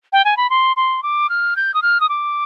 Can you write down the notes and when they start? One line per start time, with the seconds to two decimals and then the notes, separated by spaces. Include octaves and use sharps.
0.13 G5
0.25 G#5
0.37 B5
0.50 C6
0.76 C6
1.03 D6
1.29 F6
1.56 G6
1.74 D#6
1.82 F6
2.00 D#6
2.09 D6